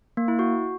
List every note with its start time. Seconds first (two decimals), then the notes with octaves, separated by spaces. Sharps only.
0.17 A#3
0.28 E4
0.39 F#4